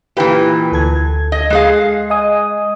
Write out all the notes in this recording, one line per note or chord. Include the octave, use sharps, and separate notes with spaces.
A#2 E3 G4 B4 G5
D2 A4 G#6
D#5
G#3 G#4 F5
D#5 G#5 D#6